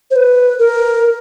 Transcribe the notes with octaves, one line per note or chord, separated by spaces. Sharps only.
C5
B4
A#4